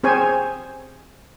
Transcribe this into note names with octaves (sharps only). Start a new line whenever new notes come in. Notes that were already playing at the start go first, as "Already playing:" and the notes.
C4 G#4 C5 C#5 G#5